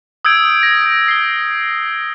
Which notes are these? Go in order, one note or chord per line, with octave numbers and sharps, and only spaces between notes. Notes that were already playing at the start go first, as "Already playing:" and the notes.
D#6 E6 G6 G#6 D7
A#6
C7 G7